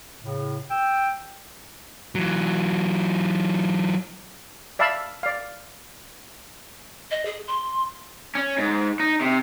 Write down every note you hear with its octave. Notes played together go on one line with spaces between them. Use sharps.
A2 C#3
G5 E6
E3 F#3
D5 E5 F5 A5 B5
D5 F5
D#5
G#4
C6
C#4
G#2
D#4
C3